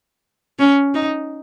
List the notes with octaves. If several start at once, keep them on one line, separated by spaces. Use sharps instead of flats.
C#4
D#4